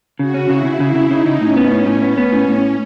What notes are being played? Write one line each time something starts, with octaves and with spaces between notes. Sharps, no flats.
C#3 F#4
C#4
C#3 E4
C#3
C#3 E4
C#3
C#3 D#4
C#3
A2 C#4
B3
A2
A2
B3 C#4
B3
A2
A2